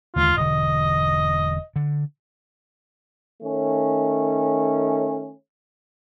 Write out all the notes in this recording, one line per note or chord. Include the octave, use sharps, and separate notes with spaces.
D#2 D3 G#3 F4
E1 D3 D#5
D3
D#3 A3 C#4